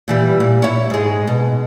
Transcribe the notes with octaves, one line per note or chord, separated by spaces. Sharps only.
A#2 E3 G3
A#2
E4 C#5
G#2 G#3
B2